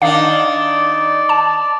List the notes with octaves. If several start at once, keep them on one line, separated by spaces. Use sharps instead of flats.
D#3 D4 D5 F5
A5